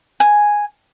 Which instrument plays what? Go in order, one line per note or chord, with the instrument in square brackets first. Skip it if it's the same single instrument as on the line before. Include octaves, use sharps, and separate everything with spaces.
[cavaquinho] G#5